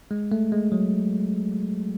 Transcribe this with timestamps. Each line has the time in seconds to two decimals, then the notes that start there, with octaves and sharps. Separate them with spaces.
0.11 G#3
0.32 A3
0.52 G#3
0.72 F#3